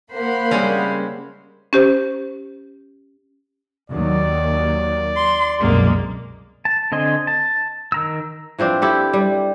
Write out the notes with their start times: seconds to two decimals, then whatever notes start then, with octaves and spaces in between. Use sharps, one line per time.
0.13 A#3 C5 F#5 B5
0.51 C#3 G3 G#3 C4 C#4
1.73 C#4 G4 C5
3.90 D#2 D#3 F#3 D5
5.16 C6
5.60 C2 F#2 B2 G#3 A#3
6.65 A5
6.92 D3 C4 D#5 G#5 C6
7.27 A5
7.92 D#3 A#5 E6
8.59 E3 F3 C4 D4
8.82 E4 G4 A4
9.13 G3